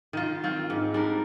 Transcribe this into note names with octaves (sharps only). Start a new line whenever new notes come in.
D#3 F4
C4 F4
G#2
G3 D4 A#4